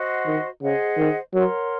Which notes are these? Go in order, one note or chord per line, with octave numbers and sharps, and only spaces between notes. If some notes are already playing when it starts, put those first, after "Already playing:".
Already playing: F#4 C5 D#5 F#5
D#3
C#3 G#4 C5 D#5 F#5
D#3
F#3 A#4 C#5 F#5 C6